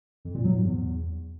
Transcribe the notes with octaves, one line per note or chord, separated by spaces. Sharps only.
F2
A#2
F#3
G#2
E2